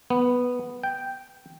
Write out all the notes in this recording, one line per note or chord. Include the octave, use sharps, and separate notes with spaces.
B3
G5